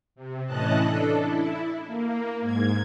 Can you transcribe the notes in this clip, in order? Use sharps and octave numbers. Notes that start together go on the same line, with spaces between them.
C3
A2 E3 C#4 D#5 A5 F#6
D4 A4
E4
A#3
G#2 G#6